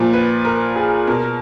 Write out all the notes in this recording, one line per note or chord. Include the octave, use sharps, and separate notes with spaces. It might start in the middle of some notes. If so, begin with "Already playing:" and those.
Already playing: A#2 F3
B4
A#4
G#4
B2 A#4